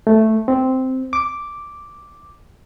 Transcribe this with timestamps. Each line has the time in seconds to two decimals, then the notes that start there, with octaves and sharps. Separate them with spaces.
0.07 A3
0.48 C4
1.13 D6